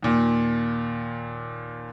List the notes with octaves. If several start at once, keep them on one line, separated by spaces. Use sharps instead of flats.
D#2 A#2